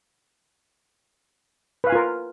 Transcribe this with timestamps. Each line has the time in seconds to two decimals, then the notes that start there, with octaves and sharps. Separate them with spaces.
1.84 B4
1.87 F5
1.90 G#5
1.92 F4
1.95 A#4